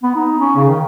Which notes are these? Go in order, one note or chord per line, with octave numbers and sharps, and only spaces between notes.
B3
D#4
C#4
C#3
D#3